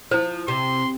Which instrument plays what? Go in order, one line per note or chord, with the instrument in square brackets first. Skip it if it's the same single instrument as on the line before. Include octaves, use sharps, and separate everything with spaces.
[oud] F3 [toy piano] E4 C5
[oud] C3 [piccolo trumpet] C6